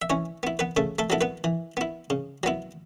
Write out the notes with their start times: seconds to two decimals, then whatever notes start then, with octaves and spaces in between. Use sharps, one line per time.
0.02 E5
0.10 E3 C#4 C#5
0.43 B3 E4
0.59 B3 B4
0.76 C#3 A3 A4
0.99 A3 A4
1.10 F#3 B3 E4 A4
1.21 B3 B4
1.44 E3
1.77 B3 E4
2.10 C#3
2.43 F#3 B3 E4